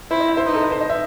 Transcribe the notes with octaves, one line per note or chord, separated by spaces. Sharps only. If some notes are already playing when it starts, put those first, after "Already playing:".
E4 C5
D#5
E5
C5
D#4 B4
A4
B4
C5
D#5
E5